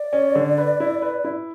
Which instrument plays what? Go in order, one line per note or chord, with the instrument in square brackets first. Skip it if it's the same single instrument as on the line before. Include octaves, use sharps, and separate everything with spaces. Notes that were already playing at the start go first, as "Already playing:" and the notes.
Already playing: [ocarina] D5
[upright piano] C#4
D3
B4
E4
B4
E4